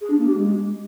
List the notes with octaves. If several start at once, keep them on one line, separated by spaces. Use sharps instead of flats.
G#4
D4
A#3
G4
G#3